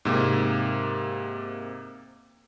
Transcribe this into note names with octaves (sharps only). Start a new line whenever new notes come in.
G#2 C3 A#3